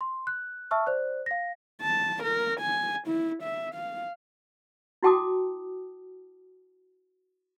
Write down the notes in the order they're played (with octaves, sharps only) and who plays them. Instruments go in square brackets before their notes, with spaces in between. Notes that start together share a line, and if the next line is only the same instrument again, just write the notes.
[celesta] C6
F#6
E5 A5 C#6 E6 F6
C5 D5 F#6
F5 A#6
[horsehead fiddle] A5
A#4
G#5
E4
E5
F5
[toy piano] E4 F#4 G5 A5 D6 D#6